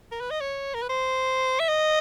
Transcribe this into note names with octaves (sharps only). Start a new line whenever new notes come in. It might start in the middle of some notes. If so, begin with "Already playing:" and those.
A#4
B4
D#5
C#5
A#4
B4
C5
E5
D#5